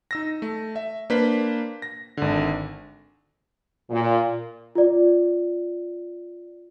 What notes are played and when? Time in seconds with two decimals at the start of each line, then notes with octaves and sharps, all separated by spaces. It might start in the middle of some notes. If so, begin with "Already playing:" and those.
0.11 D#4 E6 A#6
0.42 A3
0.76 E5
1.10 A#3 D4 B4 C5 B6
1.82 A#6
2.17 G#1 D3
3.91 A#2
4.75 F4 D5